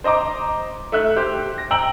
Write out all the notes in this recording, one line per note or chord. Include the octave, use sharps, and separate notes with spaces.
C5 D#5 A#5 D6
A3 E5 F#6
G4 C5
A#6
G5 A#5 E6 F#7